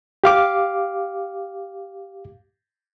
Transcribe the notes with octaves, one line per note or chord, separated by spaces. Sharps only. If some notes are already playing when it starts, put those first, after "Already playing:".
G4 F5 D6